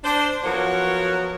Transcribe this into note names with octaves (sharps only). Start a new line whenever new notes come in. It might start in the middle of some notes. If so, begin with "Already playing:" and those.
D4 C5
F3 F#3 B3 F#4 A#4 C#5